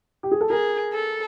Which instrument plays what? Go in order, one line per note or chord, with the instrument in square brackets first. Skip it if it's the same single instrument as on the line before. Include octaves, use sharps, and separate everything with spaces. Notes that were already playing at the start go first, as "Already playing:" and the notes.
[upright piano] G4
G#4
A4
[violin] G#4 [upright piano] A#4
[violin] A4